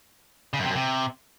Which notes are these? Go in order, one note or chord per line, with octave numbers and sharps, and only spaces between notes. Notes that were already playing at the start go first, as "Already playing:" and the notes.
C#3
F#2
C3
F#2
C3